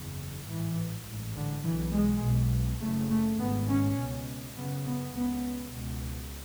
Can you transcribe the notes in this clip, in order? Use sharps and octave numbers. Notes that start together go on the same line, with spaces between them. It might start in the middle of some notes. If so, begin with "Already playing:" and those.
Already playing: F#1 E2 C#3
A1 G#2 E3
A1 G#2
D3
B1 B2 E3
G#3
B1 B2
F#1 F#2 C#3 A3
A3
G#1 G#2 B3
C#4
C#2 B2
F#1 F#2 C#3 B3
B3
C#2 C#3 B3
C#2 B2